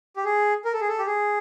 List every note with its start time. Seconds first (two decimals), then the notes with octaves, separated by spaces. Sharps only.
0.16 G4
0.25 G#4
0.65 A#4
0.73 A4
0.81 G#4
0.88 A4
0.99 G4
1.07 G#4